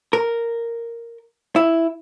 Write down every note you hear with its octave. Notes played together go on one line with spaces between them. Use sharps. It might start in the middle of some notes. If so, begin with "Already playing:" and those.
A#4
E4